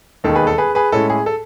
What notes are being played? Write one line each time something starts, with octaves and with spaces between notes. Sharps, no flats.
E1 D#2 D#3 A4
G#4 B4
A4
G#4 B4
G#4 B4
A2 G#3 C#4 E4 A4
G#4
A4